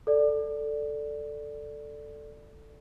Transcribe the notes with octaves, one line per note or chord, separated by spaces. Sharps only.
A4 D5